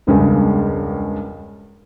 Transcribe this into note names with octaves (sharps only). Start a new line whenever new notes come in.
E1 C#2 G2 C#3 G#3